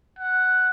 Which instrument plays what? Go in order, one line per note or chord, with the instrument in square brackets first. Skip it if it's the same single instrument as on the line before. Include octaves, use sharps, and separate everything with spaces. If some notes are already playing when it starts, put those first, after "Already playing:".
[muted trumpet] F#5